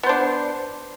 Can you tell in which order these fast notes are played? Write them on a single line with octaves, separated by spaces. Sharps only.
B3 C5 D4